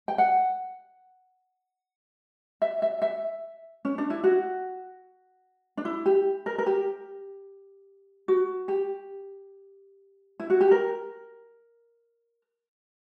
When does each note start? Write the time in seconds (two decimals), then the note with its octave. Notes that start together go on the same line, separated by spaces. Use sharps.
0.08 G5
0.18 F#5
2.62 E5
2.82 E5
3.02 E5
3.85 C#4
3.98 D4
4.10 E4
4.24 F#4
5.77 D4
5.85 E4
6.06 G4
6.46 A#4
6.58 A#4
6.66 G4
8.28 F#4
8.68 G4
10.40 E4
10.50 F#4
10.61 G4
10.71 A#4